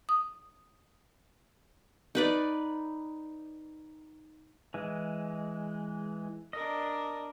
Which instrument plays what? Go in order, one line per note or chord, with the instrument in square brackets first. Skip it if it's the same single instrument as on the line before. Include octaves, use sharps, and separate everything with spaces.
[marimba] D#6
[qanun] D#4 B4 D5
[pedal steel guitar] E3 G#3
[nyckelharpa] D4 A#4 [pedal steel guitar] D#5